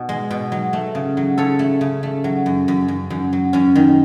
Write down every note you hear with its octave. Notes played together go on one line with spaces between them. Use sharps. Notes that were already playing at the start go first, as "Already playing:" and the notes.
Already playing: B2
G#3
B2
F#3
A3
C#3
F#3
C#3 A4 C#5
A3
C#3
A3
F#3
F#2
F#2
F#2
F#2
F#3
F#2 C#4
D#3